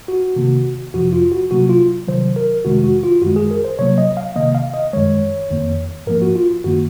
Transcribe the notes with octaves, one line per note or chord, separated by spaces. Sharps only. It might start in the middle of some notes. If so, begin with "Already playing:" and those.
F#4
C3 D#3 A#3
F2 C3 F3 F#4
F4
F#4
C3 F#3 A#3 F#4
F4
C3 D#3 F#3 C5
A#4
F2 C3 D#3 G#3 F#4
F#4
F4
F#2 D#3 G#3 F#4
G#4
A#4
C5
C3 F#3 A#3 C#5
D#5
F5
C3 D#3 A#3 D#5
F5
D#5
F#2 D#3 G#3 C#5
F2 D#3 A#3
G#2 F3 A#3 A#4
F#4
F4
F#2 D#3 A#3 F#4